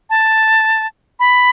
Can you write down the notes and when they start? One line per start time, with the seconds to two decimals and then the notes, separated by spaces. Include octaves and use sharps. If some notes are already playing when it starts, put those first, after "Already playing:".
0.10 A5
1.20 B5